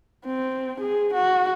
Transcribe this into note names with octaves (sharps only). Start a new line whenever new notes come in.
C4
G#4
F#4